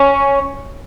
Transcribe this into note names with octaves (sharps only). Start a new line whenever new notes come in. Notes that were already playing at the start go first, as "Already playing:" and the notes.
Already playing: C#4